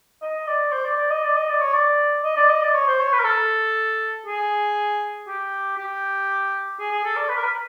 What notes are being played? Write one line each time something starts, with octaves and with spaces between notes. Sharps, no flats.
D#5
D5
C5
D5
D5
D#5
D5
D#5
D5
C#5
D5
D#5
D5
D#5
D5
C#5
C5
C#5
B4
A#4
A4
G#4
G4
G4
G#4
G#4
A4
D5
B4
A#4
B4